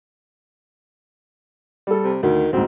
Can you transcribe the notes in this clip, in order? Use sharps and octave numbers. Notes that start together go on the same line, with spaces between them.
G3 A4
C3
D2 D#3
D2 G#2 C4